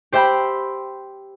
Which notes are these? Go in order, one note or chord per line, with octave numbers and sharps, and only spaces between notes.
G4 C5 E5 G5 B5